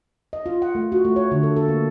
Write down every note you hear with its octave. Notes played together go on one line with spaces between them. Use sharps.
D#5
F4
F#5
A3
F#4
A3
C#5
D3
A4
A4
A#3